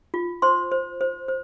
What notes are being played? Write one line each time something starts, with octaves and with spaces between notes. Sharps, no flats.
F4
C5 C6
C5
C5
C5